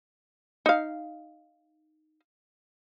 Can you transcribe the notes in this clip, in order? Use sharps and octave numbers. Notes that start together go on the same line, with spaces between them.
D#4 F5